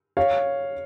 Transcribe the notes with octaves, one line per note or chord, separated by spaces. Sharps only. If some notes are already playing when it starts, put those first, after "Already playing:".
C#5 F5